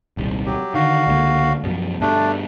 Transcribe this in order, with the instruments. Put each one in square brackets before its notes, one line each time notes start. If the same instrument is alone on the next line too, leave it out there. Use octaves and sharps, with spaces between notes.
[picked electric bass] D#1 C2
[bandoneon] F#3 G4
[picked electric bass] D3 D#3 [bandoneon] F#4 F5
[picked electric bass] C#2 D3 A#3
F#2 B2 F3
[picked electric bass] G2 B2 [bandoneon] A3 D4